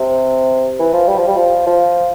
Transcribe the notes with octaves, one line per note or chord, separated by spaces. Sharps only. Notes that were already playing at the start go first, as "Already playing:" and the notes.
Already playing: C3
E3
F3
G3
F3
G3
F3
F3